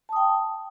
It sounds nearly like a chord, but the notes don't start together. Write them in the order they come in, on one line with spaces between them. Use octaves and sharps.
A5 D#6 G5